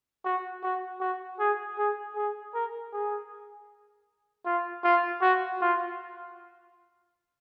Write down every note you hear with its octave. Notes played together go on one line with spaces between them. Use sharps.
F#4
F#4
F#4
G#4
G#4
G#4
A#4
G#4
F4
F4
F#4
F4